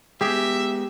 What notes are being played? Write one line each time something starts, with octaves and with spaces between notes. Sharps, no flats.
G#3 A#3 B3 G4 G#4 E5